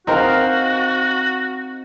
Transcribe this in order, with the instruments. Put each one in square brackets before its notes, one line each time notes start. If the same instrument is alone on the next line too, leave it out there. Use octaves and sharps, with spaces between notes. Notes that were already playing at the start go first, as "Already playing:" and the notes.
[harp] C4 F5 [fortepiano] D#4 A#4 [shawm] F#4